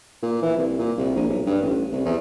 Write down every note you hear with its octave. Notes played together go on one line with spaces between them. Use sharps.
A#2
E3
C2
A#2
C2
A#1
B1
G2
A1
C2
E2